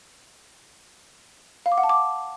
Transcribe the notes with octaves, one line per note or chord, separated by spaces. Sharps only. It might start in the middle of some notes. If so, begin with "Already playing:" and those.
F5
D6
F#5
A5
D6